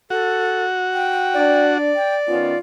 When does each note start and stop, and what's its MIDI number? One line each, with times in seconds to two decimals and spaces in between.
0.10 1.78 66
0.10 0.64 69
0.94 1.64 79
1.34 1.93 62
1.34 2.58 74
1.96 2.16 79
2.28 2.53 51
2.28 2.53 59
2.28 2.53 61
2.28 2.58 65